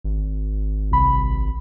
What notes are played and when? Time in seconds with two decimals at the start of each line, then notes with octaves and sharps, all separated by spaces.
0.04 G#1
0.92 C2 B5